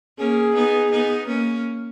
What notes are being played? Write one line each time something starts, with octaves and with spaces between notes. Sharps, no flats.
A#3 C#4 G#4
B3 D#4
B3 D#4
A#3 C#4